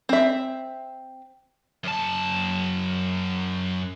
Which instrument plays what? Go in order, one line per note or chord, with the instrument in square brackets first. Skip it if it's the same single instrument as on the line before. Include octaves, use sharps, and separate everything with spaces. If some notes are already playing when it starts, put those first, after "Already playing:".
[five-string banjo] C4 E5
[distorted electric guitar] F#2 A5